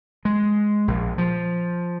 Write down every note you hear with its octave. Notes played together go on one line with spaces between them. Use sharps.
G#3
A#1
F3